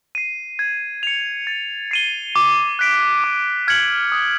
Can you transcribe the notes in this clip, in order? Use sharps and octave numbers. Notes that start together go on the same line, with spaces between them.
C7 D#7
G#6
C#7 F7
A6
C7 D#7 G7
D6
F#6 B6 D7
D6
F6 G#6 C#7 F#7
D#6